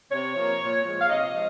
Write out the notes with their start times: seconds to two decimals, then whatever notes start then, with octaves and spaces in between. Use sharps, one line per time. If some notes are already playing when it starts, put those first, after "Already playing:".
0.10 C3 C#5
0.35 F3 A#3
0.60 A#2
0.84 F3 G#3
1.00 F5
1.09 C3 D#5
1.34 F3 G#3